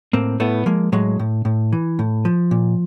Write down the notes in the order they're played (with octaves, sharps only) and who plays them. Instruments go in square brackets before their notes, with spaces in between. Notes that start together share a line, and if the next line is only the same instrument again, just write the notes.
[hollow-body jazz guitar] A2 A#3 C4
A2 A3 B3
F3 G#3 A#3
A2 F#3 G#3
A2
A2
E3
A2
F3
A#2